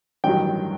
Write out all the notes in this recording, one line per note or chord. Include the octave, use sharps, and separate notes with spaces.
A1 G2 D#3 F#3 G5